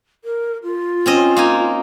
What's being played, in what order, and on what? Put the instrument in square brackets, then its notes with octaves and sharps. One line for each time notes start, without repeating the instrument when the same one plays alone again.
[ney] A#4
F4
[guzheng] C4 C#4 D#5
A#3 D#4 G#5